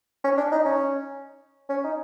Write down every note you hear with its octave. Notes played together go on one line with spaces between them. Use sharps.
C#4
D4
D#4
C#4
C#4
D#4